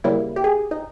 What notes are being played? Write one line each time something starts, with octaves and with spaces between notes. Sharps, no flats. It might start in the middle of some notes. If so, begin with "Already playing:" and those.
C#3 G3 A#3 E4
G4
G#4
D#4